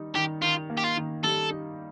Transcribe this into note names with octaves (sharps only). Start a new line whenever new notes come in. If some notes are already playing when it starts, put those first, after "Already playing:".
Already playing: D#3 G3 D#4
D#3 G4
D#3 F4
A#3
G4
F4
D#3
G3 A4
D#4